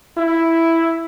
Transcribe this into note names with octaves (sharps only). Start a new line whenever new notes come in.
E4